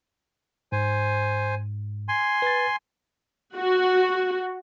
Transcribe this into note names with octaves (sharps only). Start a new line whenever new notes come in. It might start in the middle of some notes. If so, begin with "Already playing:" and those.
G#2 C5 G#5
G#5 C6
B4 A6
F#4